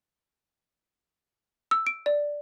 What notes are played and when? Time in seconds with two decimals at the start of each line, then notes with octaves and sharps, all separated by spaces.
1.71 E6
1.87 D7
2.06 D5